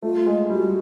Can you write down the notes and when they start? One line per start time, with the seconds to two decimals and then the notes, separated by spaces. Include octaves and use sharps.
0.02 A3 F4
0.26 G#3
0.50 G3 F#4